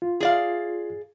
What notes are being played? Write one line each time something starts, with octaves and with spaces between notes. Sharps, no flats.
F4
G#4 D5 F5